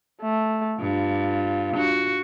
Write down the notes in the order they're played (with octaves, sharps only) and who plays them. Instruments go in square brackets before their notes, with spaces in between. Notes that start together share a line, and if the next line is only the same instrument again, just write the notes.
[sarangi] A3
[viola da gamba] G2 [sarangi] F4
[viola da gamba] F#4